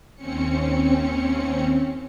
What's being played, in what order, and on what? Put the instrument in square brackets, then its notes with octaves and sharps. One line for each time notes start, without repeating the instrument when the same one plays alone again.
[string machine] D#2 C4 C#4 C#7